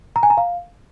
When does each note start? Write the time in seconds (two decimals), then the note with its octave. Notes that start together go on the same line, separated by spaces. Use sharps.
0.16 A#5
0.23 G#5
0.30 A#5
0.37 F5